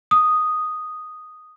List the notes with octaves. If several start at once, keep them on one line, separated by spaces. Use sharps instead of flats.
D#6